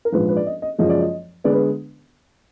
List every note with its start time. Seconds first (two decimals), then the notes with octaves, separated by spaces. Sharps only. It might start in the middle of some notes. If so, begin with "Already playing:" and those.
0.05 A#4
0.12 A#1 G#2 F3 B4
0.28 B4
0.37 D5
0.46 D#5
0.62 D#5
0.78 F#1 F#2 F3 G#3 D#5
0.90 D5
1.00 D#5
1.44 D3 G#3 B3 D5
1.53 B4